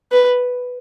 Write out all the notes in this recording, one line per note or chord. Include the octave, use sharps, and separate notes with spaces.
B4